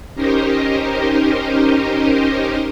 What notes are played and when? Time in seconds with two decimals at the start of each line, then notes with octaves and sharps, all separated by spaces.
0.15 C#4 D#4 G4 A#4 C5 D#5